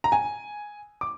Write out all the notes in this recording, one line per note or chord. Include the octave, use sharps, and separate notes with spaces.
A#5
G#5
D6